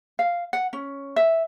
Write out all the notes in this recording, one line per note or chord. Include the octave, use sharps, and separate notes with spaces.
F5
F#5
C#4
E5